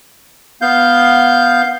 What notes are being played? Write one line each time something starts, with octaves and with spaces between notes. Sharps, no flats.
B3 F5 G6